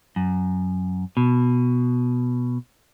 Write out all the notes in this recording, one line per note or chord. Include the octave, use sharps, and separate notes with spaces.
F#2
B2